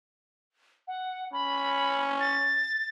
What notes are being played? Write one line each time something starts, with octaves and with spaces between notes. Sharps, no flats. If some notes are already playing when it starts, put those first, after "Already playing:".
F#5
C#4 B5
A6